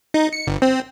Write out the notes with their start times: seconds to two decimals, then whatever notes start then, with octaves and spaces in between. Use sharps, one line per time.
0.14 D#4
0.33 C#7
0.47 G1
0.62 C4